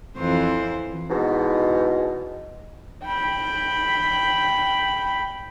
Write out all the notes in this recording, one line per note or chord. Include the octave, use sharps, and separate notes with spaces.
F2 E3 C5
E2 G#2 B2
G5 B5